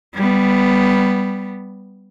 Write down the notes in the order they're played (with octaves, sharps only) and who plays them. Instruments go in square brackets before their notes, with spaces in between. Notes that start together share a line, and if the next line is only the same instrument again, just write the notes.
[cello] G3 B3